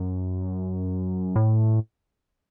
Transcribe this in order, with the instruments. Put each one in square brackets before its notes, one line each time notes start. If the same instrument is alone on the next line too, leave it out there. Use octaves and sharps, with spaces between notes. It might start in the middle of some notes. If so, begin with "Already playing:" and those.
Already playing: [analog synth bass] F#2
A2